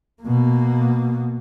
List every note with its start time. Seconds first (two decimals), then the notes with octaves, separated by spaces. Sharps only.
0.23 B2 A#3